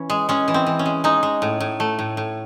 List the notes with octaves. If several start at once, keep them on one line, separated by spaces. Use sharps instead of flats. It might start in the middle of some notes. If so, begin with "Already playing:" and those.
Already playing: E3 C#4
G#3
G#3 C#4
E3
C4
E3
C#4
G#3
G#3 D#4
G#3
A2
A2
A3
A2
A2